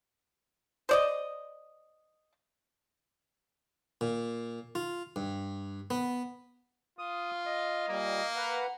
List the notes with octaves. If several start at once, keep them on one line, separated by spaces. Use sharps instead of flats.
C5 D5 D#5
A#2
F4
G2
B3
F4 D#6
D#5
A#2 G3 A#3
B4 F#5 A#5